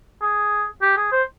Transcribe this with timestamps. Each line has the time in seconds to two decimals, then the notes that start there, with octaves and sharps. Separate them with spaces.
0.22 G#4
0.82 G4
0.97 G#4
1.12 C5